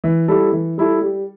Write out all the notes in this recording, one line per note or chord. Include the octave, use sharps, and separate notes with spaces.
E3
G3 E4 A4
E3
G3 E4 A4
G3